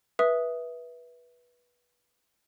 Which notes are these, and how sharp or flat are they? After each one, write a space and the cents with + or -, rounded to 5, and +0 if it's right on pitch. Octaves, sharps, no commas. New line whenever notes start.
B4 -20 E5 -5 D#6 +0